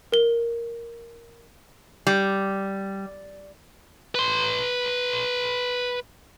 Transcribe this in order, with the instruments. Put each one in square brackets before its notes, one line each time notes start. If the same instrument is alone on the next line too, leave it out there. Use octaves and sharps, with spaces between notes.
[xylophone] A#4 G7
[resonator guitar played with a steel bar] G3
[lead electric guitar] B4 C6